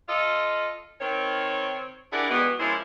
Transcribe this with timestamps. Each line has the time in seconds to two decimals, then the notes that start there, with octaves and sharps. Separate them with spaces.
0.09 F4 A4 D#5
1.01 D#3 C4 C#5
2.12 D4 E4 G4 G#4 A#4 F#5
2.30 B2 E3 G3 G#3 B3
2.59 F3 G#3 A#3 C#4 E4